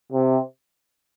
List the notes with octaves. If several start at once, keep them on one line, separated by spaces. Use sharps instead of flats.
C3